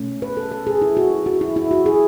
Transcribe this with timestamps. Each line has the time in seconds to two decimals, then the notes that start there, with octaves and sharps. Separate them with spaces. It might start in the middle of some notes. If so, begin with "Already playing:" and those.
Already playing: B2 A3 C#4
0.22 B4
0.37 A4
0.52 A4
0.67 G#4
0.82 E4
0.97 F#4
1.26 F#4
1.41 E4
1.56 E4
1.71 F#4
1.86 G#4